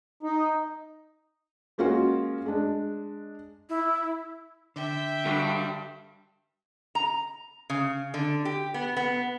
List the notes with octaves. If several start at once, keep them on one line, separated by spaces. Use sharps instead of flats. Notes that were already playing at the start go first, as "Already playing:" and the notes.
D#4
G#3 A#3 C#4 F4 F#4 G#4
G#3 D4
E4
D3 E5 G5
G2 D3 F#4
A#5
C#3
D3
G4
B3
B3